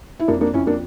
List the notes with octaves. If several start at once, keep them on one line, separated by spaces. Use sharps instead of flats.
E4
F2 A#3 D4
A#3 D4
F2 C#4 E4
A#3 D4